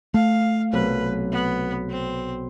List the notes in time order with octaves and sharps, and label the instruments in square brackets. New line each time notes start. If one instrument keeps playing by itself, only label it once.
[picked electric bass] A3 [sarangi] F5
[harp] B1 C3 [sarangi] B4
[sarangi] B3
C4